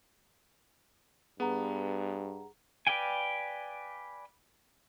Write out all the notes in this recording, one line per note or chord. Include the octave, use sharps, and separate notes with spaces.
G2 B3 G#4 F#5 A#5
B4 D5 F5 G5 G#5